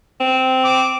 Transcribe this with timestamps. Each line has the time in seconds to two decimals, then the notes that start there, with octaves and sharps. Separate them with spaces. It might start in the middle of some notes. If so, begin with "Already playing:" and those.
0.20 C4
0.64 D6